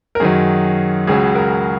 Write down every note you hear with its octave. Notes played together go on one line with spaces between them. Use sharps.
A#4
F#2 D#3 F#3 G#4
C#2 C#3 F#3 G#4
A#4